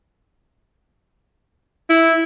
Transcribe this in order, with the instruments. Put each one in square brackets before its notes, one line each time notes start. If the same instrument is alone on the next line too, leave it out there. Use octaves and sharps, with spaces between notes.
[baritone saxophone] E4